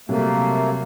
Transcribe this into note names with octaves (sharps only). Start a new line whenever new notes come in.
C3 F#3 G3 A3 A#3